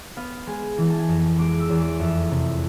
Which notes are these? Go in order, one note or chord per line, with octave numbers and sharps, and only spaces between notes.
B3 F5
G#3 G#5
E3
A5
G#5
F2
G#3 D6
E6
E2
D6
F2 E5
C3